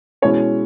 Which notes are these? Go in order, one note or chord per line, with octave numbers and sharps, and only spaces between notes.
B2 G#3 C#4 E4 C#5